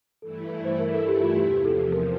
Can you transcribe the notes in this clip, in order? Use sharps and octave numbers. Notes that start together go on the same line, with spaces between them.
G2 E3 A3 E4 A4
C5
A#4
A4
G4
F4
E2 C3 F3 G4
G4
A4
A#4